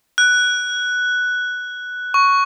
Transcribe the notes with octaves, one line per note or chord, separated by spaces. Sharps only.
F#6
C#6